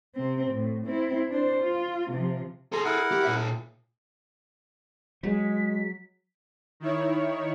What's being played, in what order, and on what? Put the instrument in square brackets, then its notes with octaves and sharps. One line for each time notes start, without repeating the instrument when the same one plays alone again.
[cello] C3 C4
A2
C4 E4
D4 C5
F4
C3 F3
[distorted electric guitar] G#4 A4 [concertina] A#5 C6
[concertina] E4 A#4 F#5
[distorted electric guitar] G4
A#2 E5
[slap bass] F#3 [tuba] G#3 [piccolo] B6
[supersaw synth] D#3 E4 C#5